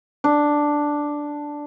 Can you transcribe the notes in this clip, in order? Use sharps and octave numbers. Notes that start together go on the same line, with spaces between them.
D4